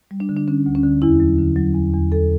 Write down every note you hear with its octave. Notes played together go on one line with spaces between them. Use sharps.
G3
D4
D3
D4
D3 C#4
D2
C#4
D3
E2 E4
F#3
D3
F#3
E2
E2
E2 A4